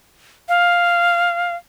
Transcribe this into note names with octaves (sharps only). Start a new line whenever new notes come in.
F5